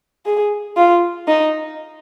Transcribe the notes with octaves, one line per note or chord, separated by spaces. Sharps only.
G#4
F4
D#4